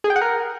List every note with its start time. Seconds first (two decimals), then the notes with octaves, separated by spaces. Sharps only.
0.04 G#4
0.10 G5
0.16 F#5
0.21 A#4